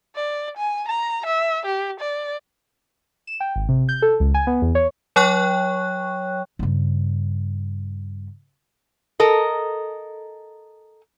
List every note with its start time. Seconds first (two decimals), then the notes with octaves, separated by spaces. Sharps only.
0.16 D5
0.57 G#5
0.88 A#5
1.26 E5
1.66 G4
2.00 D5
3.27 E7
3.40 G5
3.56 G#1
3.69 C3
3.89 G6
4.02 A4
4.20 C#2
4.34 G#5
4.47 B3
4.62 E2
4.75 C#5
5.16 F#3 C#5 G5 C#6 F#6
6.59 G2 C#3
9.20 A4 A#4 D#5